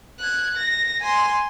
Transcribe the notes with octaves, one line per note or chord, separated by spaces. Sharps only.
F#6 G#6
A#6
G#5 C6